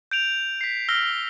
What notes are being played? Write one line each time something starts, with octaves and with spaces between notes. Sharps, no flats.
G6 D7 F7
B6 C7
E6 F6 A#6 B6 G7